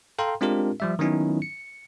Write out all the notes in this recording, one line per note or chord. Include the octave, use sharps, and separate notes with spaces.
A4 F5 G5 A#5 C6
G#3 C4 D4 F4 G4 A#4
F3 G3 E5
D#3 F#3 B3 C#4 D#4 E4
C#7